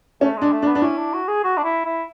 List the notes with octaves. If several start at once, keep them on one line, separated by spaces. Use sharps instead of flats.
A3 C#4
G#3
D4
A3
D4
B3
D4
C#4 E4
D4
F#4
G#4
F#4
D4
E4
E4